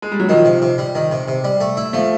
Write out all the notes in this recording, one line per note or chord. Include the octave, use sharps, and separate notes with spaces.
G#3
G3
F#3
D#3 F3
C3
C3
G3
D#3
C3
C3
G3
A3
E4
F3 A3